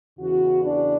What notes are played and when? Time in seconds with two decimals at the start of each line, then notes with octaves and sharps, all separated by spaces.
0.19 E2 C#3 E3 F#4
0.63 D4 D5